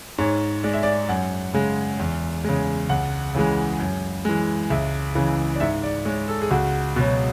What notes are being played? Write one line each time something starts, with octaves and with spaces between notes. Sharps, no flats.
G#2 C#5
G#3 D5
E5
D5
F#2 F#5
C#3 G#3
E2
C#3 G#3
C#2 F#5
C#3 E3 G#3
F#2
E3 G#3
C#2 E5
C#3 E3
D5
G#2 E5
D5
G#3 C#5
A4
G#4
C#2 F#4
B2 F#3